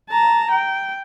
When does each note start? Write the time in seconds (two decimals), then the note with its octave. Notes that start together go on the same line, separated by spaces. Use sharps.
0.10 A5 A#5
0.51 G5